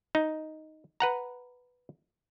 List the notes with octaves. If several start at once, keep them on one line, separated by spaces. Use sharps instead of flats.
D#4
B4 F#5 A#5